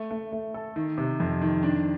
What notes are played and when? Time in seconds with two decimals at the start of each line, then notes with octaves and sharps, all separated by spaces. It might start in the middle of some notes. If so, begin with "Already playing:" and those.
Already playing: A3
0.11 A3
0.32 A3
0.54 A4
0.76 D#3
0.98 C3
1.20 F2
1.42 D#3
1.63 D4